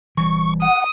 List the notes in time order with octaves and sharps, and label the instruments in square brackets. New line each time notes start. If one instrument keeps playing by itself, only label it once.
[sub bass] D#1 [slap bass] E3 G3 [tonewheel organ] C#6
[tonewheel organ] F#5 [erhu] D#6